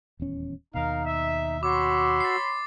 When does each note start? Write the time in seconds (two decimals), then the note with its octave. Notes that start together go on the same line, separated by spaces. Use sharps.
0.20 D#1 E2 C#4
0.74 D#2 B2 D#4 A#4 F5
1.05 E5
1.63 F#4 C#5 B5 C6 D6 E6
2.20 A6 C7